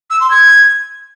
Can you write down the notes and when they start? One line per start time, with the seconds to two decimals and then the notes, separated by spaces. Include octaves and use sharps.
0.11 E6
0.21 C6
0.31 G#6